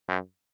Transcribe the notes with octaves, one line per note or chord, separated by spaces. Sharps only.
F#2